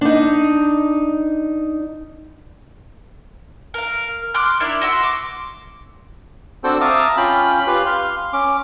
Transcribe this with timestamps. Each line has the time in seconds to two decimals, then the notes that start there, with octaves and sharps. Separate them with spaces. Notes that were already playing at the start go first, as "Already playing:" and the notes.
0.01 D4 D#4
3.74 A#4 F5
4.34 C6 D6 F6 F#6
4.60 D4 E4 A#4
4.81 F#4 C6 E6
5.03 D6
6.64 C4 D4 F#4 A4 C5 G5
6.81 E5 F5 A5 A#5 D6 D#6
7.17 C#4 F4 G5 B5
7.67 F4 G4 B4 F5
7.86 F5 C6
8.33 C#4 D6